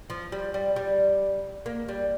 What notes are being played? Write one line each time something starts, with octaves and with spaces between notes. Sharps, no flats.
F3
G3
G3
G3
A#3
G3